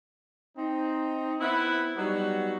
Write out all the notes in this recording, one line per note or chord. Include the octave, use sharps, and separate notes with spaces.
C4 D#4
B3 C4 E4
F#3 G3 B3 D#4 F#4